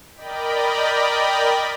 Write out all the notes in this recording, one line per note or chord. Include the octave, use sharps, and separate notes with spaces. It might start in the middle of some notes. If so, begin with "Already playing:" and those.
A#4 D5 D#5 G5 B5